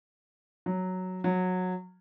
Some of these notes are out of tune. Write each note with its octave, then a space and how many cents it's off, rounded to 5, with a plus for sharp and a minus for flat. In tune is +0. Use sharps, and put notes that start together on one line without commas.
F#3 +0
F#3 -15